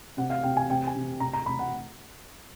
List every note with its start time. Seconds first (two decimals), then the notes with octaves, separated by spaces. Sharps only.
0.17 C3 F#5
0.30 F5
0.43 C3 G5
0.57 G#5
0.70 C3 G5
0.87 G#5
0.95 C3
1.20 C3 A#5
1.33 A#5
1.46 C3 B5
1.59 F#5